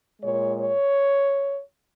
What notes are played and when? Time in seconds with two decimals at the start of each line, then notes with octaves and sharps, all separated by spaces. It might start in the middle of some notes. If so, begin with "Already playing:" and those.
0.21 A#2 G#3 C#5
0.59 C#5